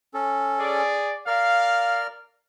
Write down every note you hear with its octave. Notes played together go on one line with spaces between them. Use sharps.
C#4 A4
G#4 D5
A#4 D5 F5 F6